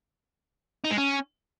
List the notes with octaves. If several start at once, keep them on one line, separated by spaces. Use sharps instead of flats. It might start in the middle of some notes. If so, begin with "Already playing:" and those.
D#4
G#3
C#4